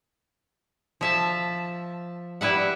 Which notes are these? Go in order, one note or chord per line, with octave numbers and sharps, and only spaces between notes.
F3 E5 A5
G3 E4 B4 E5 F#5